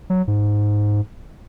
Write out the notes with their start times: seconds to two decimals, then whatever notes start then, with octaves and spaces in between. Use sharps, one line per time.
0.10 F#3
0.28 G#2